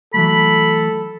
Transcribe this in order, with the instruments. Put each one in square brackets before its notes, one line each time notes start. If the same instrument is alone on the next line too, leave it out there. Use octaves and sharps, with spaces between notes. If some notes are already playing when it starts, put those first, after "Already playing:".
[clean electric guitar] E3 F#3 A3 [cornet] A4 [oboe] B5